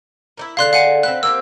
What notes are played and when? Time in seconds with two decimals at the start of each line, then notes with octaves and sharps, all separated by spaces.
0.37 A#3 D#4 E4
0.57 D3 G#4 F5 C6 F#6
0.73 F5 F#5 G#5
1.03 C4 A4 B4 F#6
1.23 A#3 C4 G4 E6